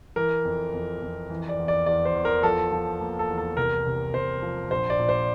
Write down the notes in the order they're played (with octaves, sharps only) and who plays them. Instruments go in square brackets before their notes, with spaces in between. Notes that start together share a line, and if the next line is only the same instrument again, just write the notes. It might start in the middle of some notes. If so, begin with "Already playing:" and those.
[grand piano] E3 A#4
F2
F2
F2
E3
D5
E2
D5
E2 D5
C5
E2
A#4
F3 A4
F3
A#3
A4
E2
A4
C2 A#4
C3
C3 C5
F3
A#1 C5
D5
A#2
C5